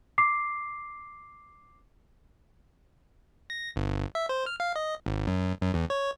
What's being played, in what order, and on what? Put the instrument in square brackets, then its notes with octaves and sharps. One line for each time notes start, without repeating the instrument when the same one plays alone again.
[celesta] D6 C7
[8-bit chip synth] A#6
G1
E5
C5
F6
F5
D#5
G#1
F#2
F#2
E2
C#5